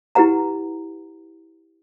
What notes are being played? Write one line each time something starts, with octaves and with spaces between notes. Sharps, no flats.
E4 G4 B4 F#5 A#5